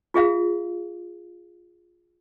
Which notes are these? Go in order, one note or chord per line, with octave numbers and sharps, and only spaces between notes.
F4 G#4 E5 F5